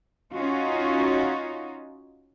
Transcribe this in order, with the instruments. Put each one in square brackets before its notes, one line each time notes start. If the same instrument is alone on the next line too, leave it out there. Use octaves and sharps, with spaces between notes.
[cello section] C#4 D#4 F4 F#4